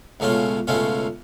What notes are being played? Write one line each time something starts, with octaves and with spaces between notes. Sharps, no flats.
C#2 B2 A3 C#4 F4
C#2 B2 A3 C#4 F4